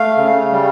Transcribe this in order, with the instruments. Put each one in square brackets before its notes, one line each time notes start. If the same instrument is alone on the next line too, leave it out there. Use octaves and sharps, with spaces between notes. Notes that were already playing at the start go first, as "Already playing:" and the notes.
Already playing: [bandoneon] A3 F5
C#3
G3